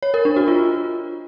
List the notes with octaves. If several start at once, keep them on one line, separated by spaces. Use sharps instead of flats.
C#5
A#4
D4
F#4
F4